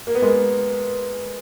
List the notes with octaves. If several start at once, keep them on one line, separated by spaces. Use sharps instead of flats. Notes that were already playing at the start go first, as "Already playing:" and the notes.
A#3
B3
G#3 A#3